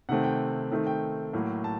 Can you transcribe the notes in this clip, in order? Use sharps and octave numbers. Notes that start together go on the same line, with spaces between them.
C3 D#3 A3 C4 F#5
G5
D#3 A3 C4
G5
A2 F#3 A#3
A5